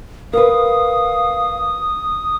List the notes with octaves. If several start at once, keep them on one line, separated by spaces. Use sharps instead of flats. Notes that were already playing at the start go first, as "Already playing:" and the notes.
A#4 B4 F5 D#6